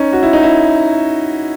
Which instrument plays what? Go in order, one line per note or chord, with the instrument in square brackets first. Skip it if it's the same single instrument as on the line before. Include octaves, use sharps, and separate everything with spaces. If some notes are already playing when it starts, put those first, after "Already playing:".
Already playing: [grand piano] C#4 D#4
F#4
E4
D#4
E4